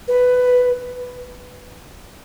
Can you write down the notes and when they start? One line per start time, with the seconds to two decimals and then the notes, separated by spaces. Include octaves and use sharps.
0.08 B4